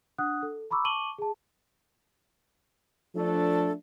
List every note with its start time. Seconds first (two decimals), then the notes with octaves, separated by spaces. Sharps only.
0.18 D4 F#5 D#6 F#6
0.43 A4
0.71 A#5 B5 C#6 D6 E6
0.84 A5 C#6 D6 D#7 F#7 G7
1.18 G#4 A5
3.15 F3 A3 D4 A4